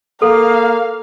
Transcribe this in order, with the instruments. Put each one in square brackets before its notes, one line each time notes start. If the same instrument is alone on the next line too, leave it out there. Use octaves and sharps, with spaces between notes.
[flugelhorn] A#3 [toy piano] A4 [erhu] F5